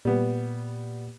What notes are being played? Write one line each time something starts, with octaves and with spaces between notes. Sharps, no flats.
A#2 G3 B3